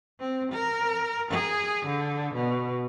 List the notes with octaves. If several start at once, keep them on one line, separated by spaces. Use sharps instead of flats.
C4
A#4
G#4
D3
B2